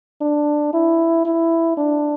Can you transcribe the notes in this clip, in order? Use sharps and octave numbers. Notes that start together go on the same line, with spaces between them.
D4
E4
E4
D4